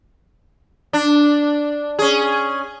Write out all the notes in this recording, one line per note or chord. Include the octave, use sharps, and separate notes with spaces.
D4
C#4 G#4